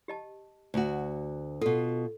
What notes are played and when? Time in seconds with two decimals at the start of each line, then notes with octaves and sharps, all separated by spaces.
0.08 G4 D#5 A5
0.74 D2 F#4
1.61 B2 F4 A4